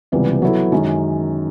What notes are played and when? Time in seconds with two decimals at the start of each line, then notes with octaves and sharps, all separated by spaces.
0.12 C#2 C3 E3 G3 B3
0.42 F#3 B3 E4 A4
0.72 F#2 D#3 G#3 C#4